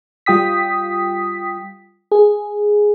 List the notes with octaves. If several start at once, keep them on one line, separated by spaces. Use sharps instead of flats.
G3 F4 G5 D#6 B6
G#4